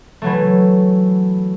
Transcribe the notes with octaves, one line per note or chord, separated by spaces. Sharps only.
E3 F#3 A3